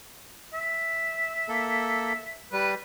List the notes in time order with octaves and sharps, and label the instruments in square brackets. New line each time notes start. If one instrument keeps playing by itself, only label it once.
[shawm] E5
[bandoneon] A#3 A4
[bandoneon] G3 [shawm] B4